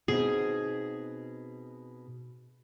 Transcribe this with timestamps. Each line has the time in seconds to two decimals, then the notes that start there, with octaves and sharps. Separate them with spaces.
0.08 B2 C4 D#4 G#4